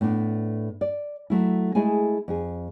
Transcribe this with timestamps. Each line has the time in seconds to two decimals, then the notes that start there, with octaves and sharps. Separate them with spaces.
0.01 A2 A3 B3 D4 E4
0.81 D5
1.30 F#3 A3 E4
1.75 G#3 A3 E4 G#4 G#5
2.28 F2 G#4